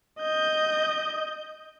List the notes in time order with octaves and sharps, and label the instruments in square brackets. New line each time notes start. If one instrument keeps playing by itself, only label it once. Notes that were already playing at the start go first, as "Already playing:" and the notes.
[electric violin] D#5 G6